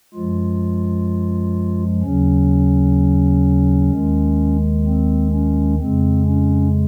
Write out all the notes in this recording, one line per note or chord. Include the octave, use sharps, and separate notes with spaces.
F#2 F3 G#3 F4
D#2 C#3 F#3 C#4
D#2 D#3 G#3
C4
C#4
F2 C#3 G#3 C4
C#4